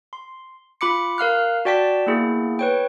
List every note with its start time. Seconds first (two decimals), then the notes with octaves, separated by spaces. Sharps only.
0.13 C6
0.81 F4 B5 D6 C#7
1.18 A#4 F5 F6 F#6
1.65 F#4 D5 G5 A5 B6
2.07 A#3 B3 E4 G#4
2.59 B4 C#5 G5